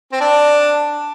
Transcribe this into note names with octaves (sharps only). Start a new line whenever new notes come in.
C4
D4